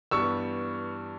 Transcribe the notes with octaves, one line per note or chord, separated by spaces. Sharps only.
G2 E3 G3 B3 C#6 E6